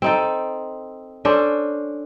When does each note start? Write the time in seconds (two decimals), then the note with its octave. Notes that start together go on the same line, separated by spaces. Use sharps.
0.02 C4 D#4 A4
1.25 C#4 D4 A4 C5